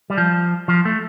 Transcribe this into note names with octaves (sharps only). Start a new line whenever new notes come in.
G3
F3
F3
A3